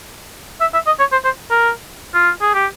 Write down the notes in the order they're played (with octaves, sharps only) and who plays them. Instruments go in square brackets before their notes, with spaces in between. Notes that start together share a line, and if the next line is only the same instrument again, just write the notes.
[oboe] E5
E5
D#5
C#5
C5
C5
A#4
F4
G#4
G4